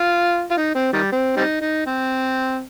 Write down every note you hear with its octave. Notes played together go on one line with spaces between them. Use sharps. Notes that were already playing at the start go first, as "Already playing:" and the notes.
Already playing: F4
F4
D#4
C4
D#3 G3
C4
G3 C4 D#4
D#4
C4